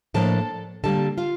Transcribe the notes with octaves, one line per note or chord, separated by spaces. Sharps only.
A2 F3 A#3 D4 A4 A5
D3 G3 A#3 A4 A5
F4 F5